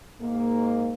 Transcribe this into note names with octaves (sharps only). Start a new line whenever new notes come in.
G#2 A#3